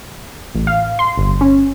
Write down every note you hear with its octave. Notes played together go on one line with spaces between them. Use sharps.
A1
F5
C6
G1
C#4